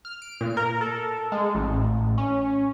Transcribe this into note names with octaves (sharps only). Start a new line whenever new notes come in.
F6
D7
A#2
A#4
A4
G#3
A1
C#4